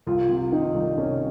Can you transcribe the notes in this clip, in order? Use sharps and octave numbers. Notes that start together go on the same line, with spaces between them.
C2 F4
C3
D#3 D#4
C2
C2 C#4